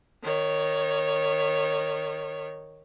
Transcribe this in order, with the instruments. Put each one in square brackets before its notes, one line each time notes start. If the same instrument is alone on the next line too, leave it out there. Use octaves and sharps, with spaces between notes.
[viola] D#3 C#5